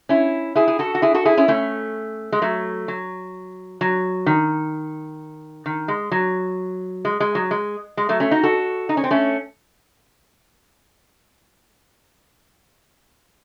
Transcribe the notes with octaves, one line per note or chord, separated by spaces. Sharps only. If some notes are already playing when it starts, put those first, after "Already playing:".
C#4 E4
E4 G#4
G#4
F#4 A4
F#4
E4 G#4
F#4 A4
E4 G#4
C#4 E4
A3 C#4
G#3
F#3 A3
F#3
F#3
D#3
D#3
G#3
F#3
G#3
G#3
F#3
G#3
G#3
F#3 A3
A3 C#4
D#4 F#4
F#4 A4
D#4
C#4
C4
A3 C#4